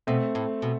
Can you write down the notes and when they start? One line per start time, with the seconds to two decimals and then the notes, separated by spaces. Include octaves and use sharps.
0.07 B2 A3 C4
0.35 A2
0.62 B2